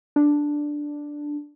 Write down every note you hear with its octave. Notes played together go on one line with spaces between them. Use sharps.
D4